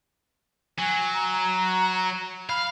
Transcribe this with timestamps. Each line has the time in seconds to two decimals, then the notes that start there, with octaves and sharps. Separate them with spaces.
0.79 F#3 G#5
1.14 A#5
2.49 F5 B5